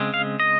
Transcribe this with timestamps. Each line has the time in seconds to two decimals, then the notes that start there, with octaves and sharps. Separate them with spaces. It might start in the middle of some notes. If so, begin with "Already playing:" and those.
Already playing: C#3 G#3 C4
0.14 F5
0.40 D#5